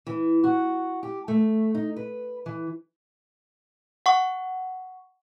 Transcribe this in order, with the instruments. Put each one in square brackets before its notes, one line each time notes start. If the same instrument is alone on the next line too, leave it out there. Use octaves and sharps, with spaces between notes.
[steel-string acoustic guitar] E3
F#4
G4
A3
D#4
B4
E3
[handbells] F#5 C#6